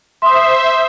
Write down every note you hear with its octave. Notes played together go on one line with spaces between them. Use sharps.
C5 E5 C6 D#6